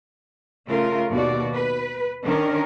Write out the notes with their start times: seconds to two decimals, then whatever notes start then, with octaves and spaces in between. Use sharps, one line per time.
0.68 C#3 A3 F4 A#4
1.10 D#2 B2 F#4 D5
1.55 B4
2.23 D#3 C#4 D4 A#4